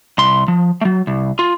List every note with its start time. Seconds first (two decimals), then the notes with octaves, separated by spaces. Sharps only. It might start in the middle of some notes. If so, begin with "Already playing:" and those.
0.18 C2 C6
0.48 F3
0.81 F#3 A3
1.07 C2
1.39 F4